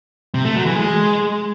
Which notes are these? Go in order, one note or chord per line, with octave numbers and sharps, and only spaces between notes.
C3
A3
F#3
E3
G#3